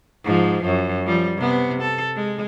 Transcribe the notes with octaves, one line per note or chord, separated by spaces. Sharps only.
G#2 F3
F#2
F3 G3
C3 B3
A4
G#3